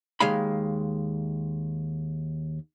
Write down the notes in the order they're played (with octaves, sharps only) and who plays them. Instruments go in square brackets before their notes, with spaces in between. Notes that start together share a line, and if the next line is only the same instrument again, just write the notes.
[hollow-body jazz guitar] D#2 G#3 F5 B5